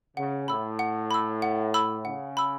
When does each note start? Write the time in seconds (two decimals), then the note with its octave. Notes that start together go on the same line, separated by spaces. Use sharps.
0.17 C#3 F#5
0.48 A2 B5 E6
0.79 F#5
1.11 B5 E6
1.42 F#5
1.74 B5 E6
2.05 C#3 F#5
2.37 B5 E6